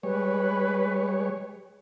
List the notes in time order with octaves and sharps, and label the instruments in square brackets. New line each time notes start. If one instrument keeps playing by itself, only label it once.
[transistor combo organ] G3 G#3 C#5 [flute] B4